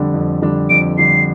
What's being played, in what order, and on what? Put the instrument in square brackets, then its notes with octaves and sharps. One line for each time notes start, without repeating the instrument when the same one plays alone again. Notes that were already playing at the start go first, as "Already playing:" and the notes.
Already playing: [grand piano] F2 D3 G3 D4
F2
D3 G3 D4
[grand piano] F2 [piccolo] D7
[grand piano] D3 G3 D4 [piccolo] C7